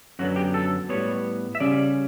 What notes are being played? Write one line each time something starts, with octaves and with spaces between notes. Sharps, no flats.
F#2 D3 F#3 B3 F#4
G4
A4
A2 G3 B3 C#5
E5
C#3 G3 C#4 D5